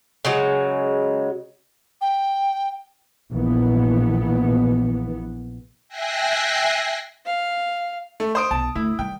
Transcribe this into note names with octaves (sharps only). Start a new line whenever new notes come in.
C#3 F#3 G#3
G5
A#1 E3 B3
E5 G5 G#5 F#6 A#6 C7
F5
A3
C5 D#6 D7
B1 A5
D2 E4
D#3 G3 G5